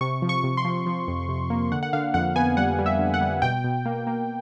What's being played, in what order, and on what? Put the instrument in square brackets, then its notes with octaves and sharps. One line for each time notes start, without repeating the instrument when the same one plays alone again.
[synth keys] C3 C#6
F3
C#6
C3
C6
F3
F3
F2
C3
A#3
D3 F#5
F#5
D3 F5
F2 F#5
B3 G#5
G3 F#5
G3
E5
D3
F#5
G3
B2 G5
B2
A#3
A#3